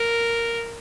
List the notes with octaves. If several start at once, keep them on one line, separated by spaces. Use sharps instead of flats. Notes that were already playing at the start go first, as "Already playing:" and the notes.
Already playing: A#4